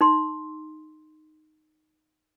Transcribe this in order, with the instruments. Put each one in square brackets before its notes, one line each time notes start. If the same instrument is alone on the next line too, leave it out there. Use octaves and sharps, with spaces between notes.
[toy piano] D#4 C6